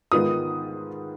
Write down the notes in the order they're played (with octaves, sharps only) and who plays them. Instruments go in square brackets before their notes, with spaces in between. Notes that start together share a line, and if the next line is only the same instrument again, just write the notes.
[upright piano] G#2 D#3 B3 F4 D#6